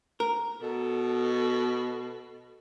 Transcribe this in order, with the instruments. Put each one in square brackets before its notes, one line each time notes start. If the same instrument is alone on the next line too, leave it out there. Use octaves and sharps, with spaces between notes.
[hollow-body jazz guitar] A#4
[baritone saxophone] B2 [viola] A4